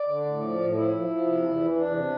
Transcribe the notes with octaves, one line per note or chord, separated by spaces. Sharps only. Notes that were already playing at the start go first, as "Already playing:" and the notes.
Already playing: D5
D3
A2
F3
A2
F3 E4
F3
F3
C3
E2
E3
E2 D4
C3